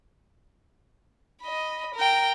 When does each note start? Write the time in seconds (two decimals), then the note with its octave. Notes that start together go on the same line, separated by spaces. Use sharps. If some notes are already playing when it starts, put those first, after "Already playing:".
1.42 D#5 B5
1.95 A#4 G5